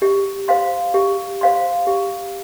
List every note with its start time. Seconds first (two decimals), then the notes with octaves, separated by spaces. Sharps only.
0.02 G4
0.48 C5 F5 C6
0.94 G4
1.41 C5 F5 C6
1.87 G4